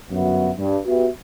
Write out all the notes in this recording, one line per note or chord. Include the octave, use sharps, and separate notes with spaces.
G1 F#2 B3 F#4 E5
G2
B3 F#4 G4 B4 E5